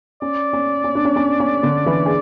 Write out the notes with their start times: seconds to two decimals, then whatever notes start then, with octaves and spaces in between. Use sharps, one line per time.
0.22 C#4 D5
0.53 C#4
0.84 C#4
0.95 D4
1.05 C#4
1.16 C#4
1.40 C#4
1.63 D3 D4
1.86 E3 E4
2.06 G#4